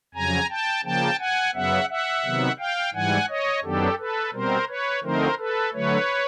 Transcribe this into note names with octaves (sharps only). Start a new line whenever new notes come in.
F2 C#3 F#3 G#5 A#5
G5 A5
C#3 F3 A#3 G5 A5
F#5 G#5
F#2 C#3 F#3 B3 E5 F#5
E5 F#5
C3 D#3 F#3 B3
F5 G5
G#2 E3 G3 F#5 G#5
C#5 D#5
F#2 D#3 F#3 B3 D4 G4 A4
A4 B4
B2 G3 C4 A#4 C5
B4 C#5
D3 F3 A3 C4 D#4 A#4 C5
A4 B4
D3 F#3 A3 B4 C#5